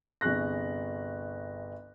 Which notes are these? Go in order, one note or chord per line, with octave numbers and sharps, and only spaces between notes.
G1 C2 G#4 C#6 F#6 A#6